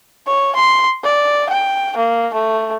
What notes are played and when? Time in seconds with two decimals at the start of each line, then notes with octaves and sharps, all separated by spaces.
0.27 C#5
0.55 C6
1.04 D5
1.49 G5
1.97 A#3
2.33 A3